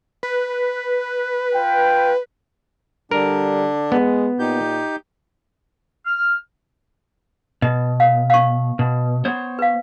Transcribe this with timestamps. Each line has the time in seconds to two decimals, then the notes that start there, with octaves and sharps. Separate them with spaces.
0.23 B4
1.53 F4 G5
3.11 D3 G3 D4 A#4
3.92 G#3 B3
4.39 A#2 D#4 G4 G6
6.06 F6
7.62 B2 D#5
8.00 F5
8.30 F5 C#6
8.79 B2
9.25 B3 C5 C#5
9.59 B4 F5